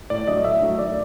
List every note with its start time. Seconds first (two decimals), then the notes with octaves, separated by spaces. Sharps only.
0.10 A2 D5
0.28 F#3 A3 D4 D#5
0.44 A2 E5
0.61 F#3 A3 D4
0.79 D#3 D5